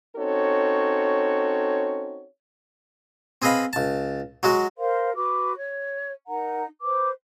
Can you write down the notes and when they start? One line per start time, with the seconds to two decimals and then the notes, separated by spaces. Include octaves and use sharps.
0.17 C4 C#4 D#4 F#4 A4 C#5
3.42 C4 G#4 B4 D#5 F5 B5
3.73 C#2 A5
4.43 F#3 G#3 F#4
4.77 A#4 C5 F5 C6
5.15 F#4 B4 D6
5.56 C#5
6.27 D#4 A#4 F#5 A#5
6.81 B4 C5 D6